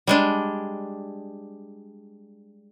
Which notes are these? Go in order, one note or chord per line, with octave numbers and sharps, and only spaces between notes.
G3 G#3 D4